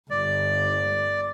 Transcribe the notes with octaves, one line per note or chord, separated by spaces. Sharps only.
G1 D5